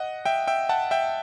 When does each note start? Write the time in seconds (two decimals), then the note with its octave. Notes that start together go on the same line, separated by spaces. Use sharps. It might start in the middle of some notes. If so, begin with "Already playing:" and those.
Already playing: D#5 F#5
0.25 E5 G5
0.47 E5 G5
0.69 F#5 A5
0.91 E5 G5